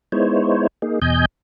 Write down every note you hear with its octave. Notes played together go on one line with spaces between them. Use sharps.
G#3 B3 D#4 E4 C5 C#5
A#3 D#4 G#4
E2 B2 D#5 G#5 G6